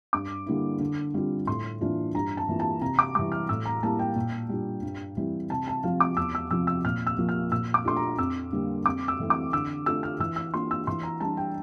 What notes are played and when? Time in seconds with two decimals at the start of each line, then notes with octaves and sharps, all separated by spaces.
0.13 G2 D6
0.46 D3 G3 A#3 E4
0.80 D3
1.14 G3 C4 F4
1.47 A2 C6
1.81 E3 A#3 D4 F4
2.14 G2 A#5
2.37 A5
2.48 E3 A#3 F4
2.60 A5
2.81 C3 A#5
2.99 D6
3.15 E3 G3 D6
3.32 F6
3.49 A2 E6
3.65 A#5
3.83 G3 A#3 E4 A5
3.99 G5
4.16 A#2
4.49 G3 D4 F4
4.82 G2
5.17 E3 G3 C4 E4
5.50 C3 A5
5.67 A5
5.83 F3 C4 F4 F5
6.00 D6
6.17 E2 E6
6.35 E6
6.51 C3 F3 C4 F4 E6
6.67 E6
6.85 A#2 F6
7.07 E6
7.18 F3 A#3 F4
7.29 F6
7.52 A#2 E6
7.74 D6
7.85 A3 D4 F4 C6
7.96 A#5
8.18 F2 E6
8.52 D3 G3 A#3
8.85 F2 D6
9.08 E6
9.20 E3 A3 C4
9.30 D6
9.53 D3 E6
9.86 A3 D4 F4 E6
10.03 F6
10.20 E3 E6
10.36 E6
10.54 A#3 D4 F4 C6
10.71 E6
10.87 E3 C6
11.03 A#5
11.20 G3 D4 A5
11.37 G5